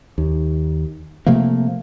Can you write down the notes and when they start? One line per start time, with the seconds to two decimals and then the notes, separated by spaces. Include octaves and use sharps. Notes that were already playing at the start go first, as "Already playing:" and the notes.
0.18 D#2
1.26 C3 F3 A3 A#3